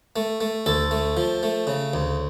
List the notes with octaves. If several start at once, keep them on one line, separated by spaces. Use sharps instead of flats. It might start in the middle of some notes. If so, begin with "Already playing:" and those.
A3
A3
D2 A4
A3
F3
A3
C#3
D2